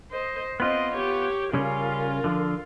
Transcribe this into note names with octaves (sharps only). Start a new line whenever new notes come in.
C5 D#5
B3 C4 F4 D#5
G4 C#5
C#3 G3 C#4 F4 A#4
D3 F3